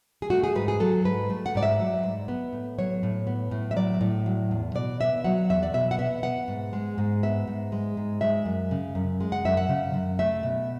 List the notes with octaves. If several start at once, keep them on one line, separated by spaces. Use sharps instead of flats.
G#4
A3 F#4
G#4
G#2 B4
G#4
F#3 A4
G#2 B4
A3
F#5
G#2 D5
E5
F#3
G#2
B3
A2
F#3 C#5
A2
B3
A2
E5
F#3 D5
A2
F#3
E2
B2 D5
B3 E5
F#3 F#5
E2 E5
D5
B2 E5
F#5
B3 E5
B3 F#5
G#2
G#3
G#2
B3 E5
G#2
G#3
G#2
G#3 E5
F#2
C#3
F#2
G#3
F#5
F#2 E5
F#5
C#3
F#2
A3 E5
B2